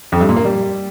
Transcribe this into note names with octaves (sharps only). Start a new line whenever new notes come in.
F2
G2
A#2
A#3
G3